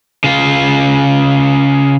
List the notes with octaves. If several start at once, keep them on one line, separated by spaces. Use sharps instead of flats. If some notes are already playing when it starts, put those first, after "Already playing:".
C#3 F4